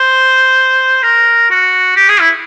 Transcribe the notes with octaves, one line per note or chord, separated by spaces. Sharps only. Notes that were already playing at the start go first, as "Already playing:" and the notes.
Already playing: C5
A#4
F#4
G4
G#4
E4